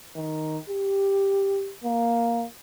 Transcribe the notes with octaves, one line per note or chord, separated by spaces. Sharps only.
D#3
G4
A#3